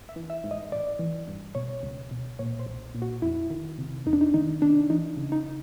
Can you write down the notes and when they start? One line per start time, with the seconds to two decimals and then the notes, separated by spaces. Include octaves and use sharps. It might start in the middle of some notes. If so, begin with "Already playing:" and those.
Already playing: G#1
0.09 E5
0.16 E3
0.30 E5
0.44 G#2
0.51 D#5
0.72 A1 D5
0.99 E3
1.28 G2
1.55 B2 C#5
1.83 C#2
2.11 B2
2.39 A#2 C#5
2.59 C5
2.66 B1
2.95 A#2
3.02 F#4
3.22 F2 E4
3.50 D#3
3.78 C3
4.06 F2 D#4
4.13 D4
4.21 D#4
4.34 D#3 D#4
4.62 C3 D4
4.90 E3 D#4
5.17 C#3
5.32 D#4